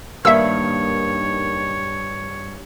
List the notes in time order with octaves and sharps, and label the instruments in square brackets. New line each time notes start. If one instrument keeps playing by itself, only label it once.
[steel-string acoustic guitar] G2 [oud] D#3 A#3 [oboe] C#5 [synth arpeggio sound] E5 E6